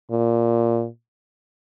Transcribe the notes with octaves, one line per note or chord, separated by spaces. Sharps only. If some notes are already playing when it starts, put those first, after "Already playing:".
A#2